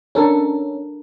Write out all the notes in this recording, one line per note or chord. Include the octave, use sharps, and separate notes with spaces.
C#4 D4 A4 A#4